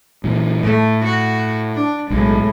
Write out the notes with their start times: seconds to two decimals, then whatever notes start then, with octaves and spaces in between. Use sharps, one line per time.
0.24 A#2 E3
0.63 A2 A3
1.04 F#4
1.75 D4
2.10 B1 A2 G#3